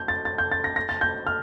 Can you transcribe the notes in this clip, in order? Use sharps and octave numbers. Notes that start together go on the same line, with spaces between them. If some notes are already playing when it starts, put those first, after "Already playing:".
Already playing: G6
A6
A6
G6
A6
A#6
A#6
A6
G6
F6